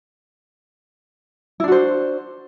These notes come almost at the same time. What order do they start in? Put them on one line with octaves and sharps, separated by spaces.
E4 D4 F#4 C5